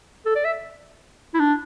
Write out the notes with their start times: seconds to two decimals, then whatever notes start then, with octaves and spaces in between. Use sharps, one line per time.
0.26 A4
0.36 D5
0.45 E5
1.34 E4
1.39 D4